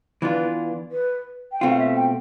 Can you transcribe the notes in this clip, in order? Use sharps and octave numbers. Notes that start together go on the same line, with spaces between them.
E3 B3 D4 F4 B4
B4
G5
B2 A3 C4 F4 F5
E5
G5